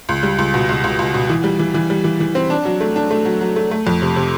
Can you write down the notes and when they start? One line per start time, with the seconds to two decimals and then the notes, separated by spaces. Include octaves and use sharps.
0.09 C#2
0.23 G3
0.39 C#2
0.54 B2
0.69 C#2
0.84 C#2
0.99 C#2
1.14 B2
1.29 E3
1.44 G3
1.59 E3
1.74 E3
1.90 G3
2.04 E3
2.20 E3
2.35 C4
2.50 D4
2.65 F#3
2.81 A3
2.96 D4
3.11 A3
3.25 F#3
3.41 F#3
3.56 A3
3.71 A3
3.87 F2
4.02 C3
4.16 C3